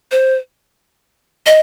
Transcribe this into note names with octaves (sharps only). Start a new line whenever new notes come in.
C5
D#5